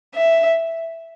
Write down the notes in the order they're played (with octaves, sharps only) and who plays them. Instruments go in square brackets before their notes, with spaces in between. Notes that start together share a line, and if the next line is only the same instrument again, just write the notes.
[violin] E5